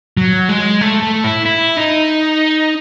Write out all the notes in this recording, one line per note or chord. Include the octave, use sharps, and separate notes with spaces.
F#3
G#3
A3
A3
E4
E4
D#4